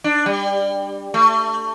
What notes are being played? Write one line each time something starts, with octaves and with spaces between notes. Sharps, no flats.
D4
G3
A3